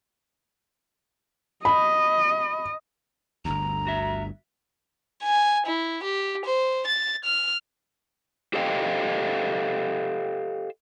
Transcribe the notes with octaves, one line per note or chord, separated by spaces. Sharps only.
D#5 B5
G1 D2 A#5
F#4 E5
G#5
E4
G4
C5
A6
F6
G4 A4 C5 D#5 F5 G5